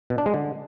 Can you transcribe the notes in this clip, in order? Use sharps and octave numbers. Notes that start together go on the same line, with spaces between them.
B2
D4
G#3
D3